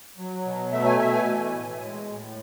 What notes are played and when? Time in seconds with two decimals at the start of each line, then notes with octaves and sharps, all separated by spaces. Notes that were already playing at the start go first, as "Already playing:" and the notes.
0.18 F#3
0.45 B2
0.72 A3 E5
0.86 G#5
0.99 B2 E5
1.13 G#5
1.26 E3
1.53 A2
1.82 G#3
2.09 A2